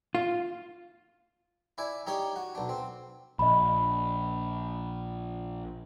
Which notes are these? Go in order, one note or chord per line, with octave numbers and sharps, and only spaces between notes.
F4
E4 D5 G#5
D#4 G4 C#5 D5
F#4
B1 D4
C4
A#1 D#5 B5